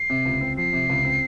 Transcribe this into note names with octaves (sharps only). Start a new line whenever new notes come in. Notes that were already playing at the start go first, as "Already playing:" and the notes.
Already playing: C7
C3
C#2
C4
F3 C7
C3
C#2
C4